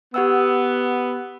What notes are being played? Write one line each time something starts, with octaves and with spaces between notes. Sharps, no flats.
B3 G4 F#5 E6